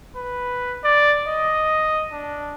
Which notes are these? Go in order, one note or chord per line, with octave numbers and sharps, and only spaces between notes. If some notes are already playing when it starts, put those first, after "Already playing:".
B4
D5
D#5
D4